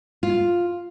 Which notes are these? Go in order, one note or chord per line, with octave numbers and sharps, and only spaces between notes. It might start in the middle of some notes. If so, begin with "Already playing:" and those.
F4